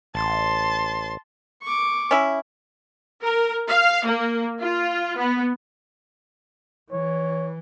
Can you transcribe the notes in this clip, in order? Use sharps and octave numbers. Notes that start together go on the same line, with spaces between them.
A1 A5 C6
C#6 D6
C#4 E4
A#4
F5
A#3
F4
B3
E3 C#5